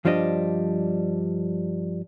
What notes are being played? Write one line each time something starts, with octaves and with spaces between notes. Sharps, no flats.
G2 F3 G3 D4 A#4 D#5